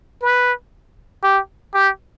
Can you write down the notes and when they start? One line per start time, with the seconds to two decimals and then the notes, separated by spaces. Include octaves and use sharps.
0.22 B4
1.24 G4
1.74 G4